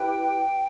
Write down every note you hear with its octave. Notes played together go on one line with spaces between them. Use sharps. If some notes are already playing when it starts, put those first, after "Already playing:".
Already playing: E4 G4 B4 G5